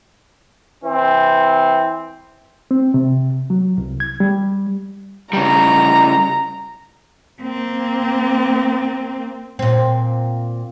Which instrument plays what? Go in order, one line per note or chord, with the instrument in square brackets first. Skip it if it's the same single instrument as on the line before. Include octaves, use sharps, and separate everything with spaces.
[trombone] E3 [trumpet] C4
[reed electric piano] C4
C3
F#3
C2
G#6
G3
[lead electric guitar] C#3 G3 [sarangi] A#5
[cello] A#3 C4
[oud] A#2 C4